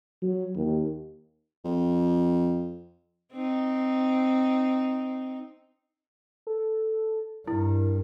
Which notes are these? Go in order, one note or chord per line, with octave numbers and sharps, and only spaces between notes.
F#3
D#2
F2
C4 D#4
A4
G2 E4 A#4